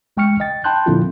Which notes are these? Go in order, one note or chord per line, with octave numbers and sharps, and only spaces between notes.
A1 G#3 G5 C#6 F6 C#7
D#5 G5 A6
G5 A5 B5 C6 F#6 G6
A#2 D3 F3 C4 E4 F4